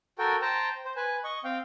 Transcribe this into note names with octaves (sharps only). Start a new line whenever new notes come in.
F#4 A4 A#4 G5
C5 G5 A5 A#5
C5
B4 G#5
D#5 C#6
C4 F5 G5